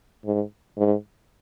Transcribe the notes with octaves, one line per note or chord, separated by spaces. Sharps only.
G#2
G#2